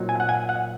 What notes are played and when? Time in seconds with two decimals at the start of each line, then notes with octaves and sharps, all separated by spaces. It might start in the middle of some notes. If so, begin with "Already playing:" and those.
Already playing: A#2 F#3 C4 D#4
0.09 G#5
0.20 F#5
0.29 G#5
0.49 F#5